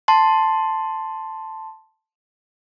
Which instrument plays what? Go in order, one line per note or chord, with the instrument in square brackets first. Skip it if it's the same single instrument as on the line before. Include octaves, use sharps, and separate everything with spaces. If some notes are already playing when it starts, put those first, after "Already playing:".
[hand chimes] A5 C6